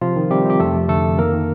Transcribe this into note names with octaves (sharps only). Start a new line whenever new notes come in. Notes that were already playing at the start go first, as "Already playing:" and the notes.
C3 F3 F4
D#3
C3 G3 G4
C3 G4
F2 A3 A4
F2
D3 A3 A4
F2
D#3 A#3 A#4
D#3